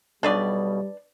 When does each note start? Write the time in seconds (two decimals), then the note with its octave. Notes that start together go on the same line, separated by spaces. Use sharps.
0.23 B1 B2 G3 D4 B4 D5